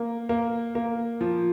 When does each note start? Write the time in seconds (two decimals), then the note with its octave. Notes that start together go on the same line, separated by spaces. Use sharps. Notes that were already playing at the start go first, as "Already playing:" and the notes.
Already playing: A#3
0.29 A#3
0.75 A#3
1.21 F3